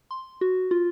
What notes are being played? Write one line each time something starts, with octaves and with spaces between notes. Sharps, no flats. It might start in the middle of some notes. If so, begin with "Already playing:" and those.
C6
F#4
F4